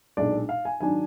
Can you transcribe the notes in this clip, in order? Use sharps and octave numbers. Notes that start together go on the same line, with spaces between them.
B1 A#2 G#3 D4 D5
F5
G#5
G#2 D#3 F#3 D4 G#5